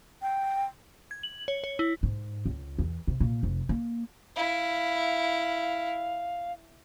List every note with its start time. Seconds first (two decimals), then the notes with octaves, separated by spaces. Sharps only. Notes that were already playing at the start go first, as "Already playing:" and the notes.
0.22 G5
1.11 G#6
1.23 F#7
1.48 C#5
1.64 C#5
1.79 E4
2.03 G#2
2.46 C#2
2.79 E2
3.07 C3
3.20 A#2
3.43 F1
3.69 A#3
4.36 E4 F5